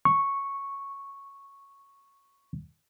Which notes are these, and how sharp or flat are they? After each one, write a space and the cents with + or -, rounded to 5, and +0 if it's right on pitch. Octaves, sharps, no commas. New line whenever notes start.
C#6 -5